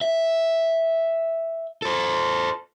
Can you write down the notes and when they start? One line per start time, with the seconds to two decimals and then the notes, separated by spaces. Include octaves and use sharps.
0.01 E5
1.82 A4 C5